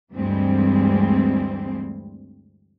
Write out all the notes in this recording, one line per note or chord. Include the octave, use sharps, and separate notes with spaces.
D2 G2 E3 G3 G#3 C4